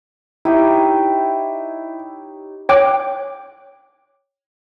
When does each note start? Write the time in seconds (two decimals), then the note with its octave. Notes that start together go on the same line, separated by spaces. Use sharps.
0.45 D#4 E4 G4 C#5
2.69 C#5 G5 D6 F#6